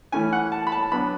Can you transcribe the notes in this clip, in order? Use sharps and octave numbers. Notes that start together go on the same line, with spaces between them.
E3 A3 C#4 E4 G#5
F#5
A5
B5
A5
F#3 B3 D4 B5